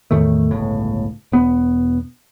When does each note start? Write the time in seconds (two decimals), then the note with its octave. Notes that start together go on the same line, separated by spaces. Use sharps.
0.11 E2 A2 D#3 A3
0.51 G1 C#2 A2
1.32 E1 B3